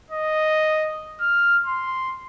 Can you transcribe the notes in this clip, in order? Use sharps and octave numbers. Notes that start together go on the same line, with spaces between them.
D#5
F6
C6